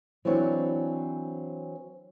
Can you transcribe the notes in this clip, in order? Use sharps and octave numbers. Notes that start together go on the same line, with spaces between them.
E3 F#3 C4 D4 C#5